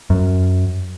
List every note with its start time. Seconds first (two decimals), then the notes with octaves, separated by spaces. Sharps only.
0.10 F#2